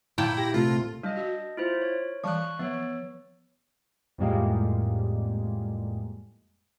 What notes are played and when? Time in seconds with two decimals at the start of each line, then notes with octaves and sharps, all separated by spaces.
0.18 A#2 E4 G5 A5
0.37 G4 A#6
0.54 C3 A3 F4
1.03 G3 D4 D#5
1.17 F#4
1.57 E4 F4 C5
1.82 C#5
2.24 E3 G3 A5 C#6 F#6
2.59 F3 B3 C#5
4.18 F2 A2 G3 G#3 A#3